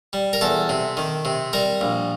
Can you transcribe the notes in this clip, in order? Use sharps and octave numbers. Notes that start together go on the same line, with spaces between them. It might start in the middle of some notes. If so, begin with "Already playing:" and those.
G3
A#4
E2 A4
C3
D#3
C3
G3 A#4
A#1